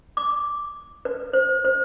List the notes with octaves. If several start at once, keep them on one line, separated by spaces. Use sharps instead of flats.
D6
B4
C5
C5